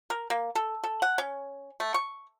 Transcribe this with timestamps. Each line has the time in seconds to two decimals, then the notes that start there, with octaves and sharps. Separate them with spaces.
0.10 A#4
0.30 A#3
0.55 A4
0.84 A4
1.02 F#5
1.18 C#4
1.80 A3
1.94 C#6